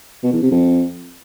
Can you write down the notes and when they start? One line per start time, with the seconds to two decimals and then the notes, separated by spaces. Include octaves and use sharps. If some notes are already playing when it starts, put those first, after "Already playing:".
0.23 B2
0.33 E2
0.42 C3
0.51 F2